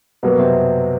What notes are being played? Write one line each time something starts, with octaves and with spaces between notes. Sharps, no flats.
B2 F#3 A#3 B3
C3 C4